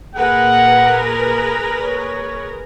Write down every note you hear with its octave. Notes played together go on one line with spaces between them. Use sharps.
A#2 G#4 A#4 B4 F#5
A#5
C#5